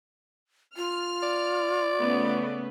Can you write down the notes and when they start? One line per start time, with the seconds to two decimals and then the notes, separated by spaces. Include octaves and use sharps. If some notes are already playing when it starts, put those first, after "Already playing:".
0.77 F4 F6
1.23 D5
1.99 C#3 A3 B3